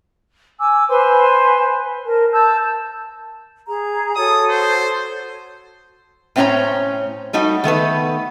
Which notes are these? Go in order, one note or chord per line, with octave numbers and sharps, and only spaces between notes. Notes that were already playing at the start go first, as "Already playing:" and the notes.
G#5 D6 E6
B4 C5 G#5 C6
A#4 A5
A5 E6 G6
G#4 A#5
F#4 A4 C#5 D#6
C5
A2 C4 C#4 E4 C#5 A#5
G3 A3 D#4 F#4
D#3 A3 B3 B4